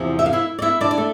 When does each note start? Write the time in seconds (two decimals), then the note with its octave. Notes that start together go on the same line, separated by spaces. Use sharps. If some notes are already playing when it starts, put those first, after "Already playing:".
Already playing: E2 C3 F3
0.19 E5
0.26 F5
0.33 E4 E5
0.59 D5
0.62 E4 E5
0.81 D4 D5
0.91 D5
0.98 A3